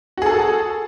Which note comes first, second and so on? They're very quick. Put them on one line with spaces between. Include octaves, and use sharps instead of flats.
F#4 G#4 A4